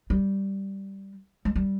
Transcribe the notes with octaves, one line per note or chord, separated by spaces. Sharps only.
G3
G#3
G3